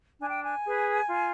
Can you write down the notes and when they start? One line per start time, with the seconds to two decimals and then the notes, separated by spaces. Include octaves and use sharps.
0.20 D4 G#5
0.31 G5
0.42 G#5
0.64 G#4 B4
1.09 F4